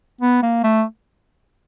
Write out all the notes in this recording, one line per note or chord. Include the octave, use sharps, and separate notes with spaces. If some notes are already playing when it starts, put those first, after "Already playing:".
B3
A#3
A3